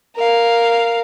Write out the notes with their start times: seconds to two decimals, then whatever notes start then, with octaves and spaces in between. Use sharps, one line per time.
0.16 A#4 F5